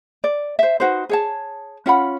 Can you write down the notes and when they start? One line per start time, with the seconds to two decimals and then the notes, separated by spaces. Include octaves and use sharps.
0.24 D5
0.59 C5 E5
0.80 D#4 F#4 B4 C5
1.09 G#4 C#5 A5
1.86 C#4 F4 F#5 B5